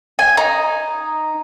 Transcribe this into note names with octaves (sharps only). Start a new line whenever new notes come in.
G#5
D#4